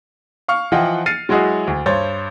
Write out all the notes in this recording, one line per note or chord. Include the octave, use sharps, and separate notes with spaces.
F5 C#6 F6
E3 F3 F4 D#5 F#5 G5
F6 A6 C7 C#7 D#7
F#3 G#3 E4 F#4 G#4 D#5
D2
G2 C5 C#5 A6